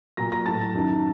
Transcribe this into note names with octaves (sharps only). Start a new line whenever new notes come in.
A#2 F#3 A#5 A#6
A#5 A#6
A2 F#3 A5 A6
F#2 D#3 F#3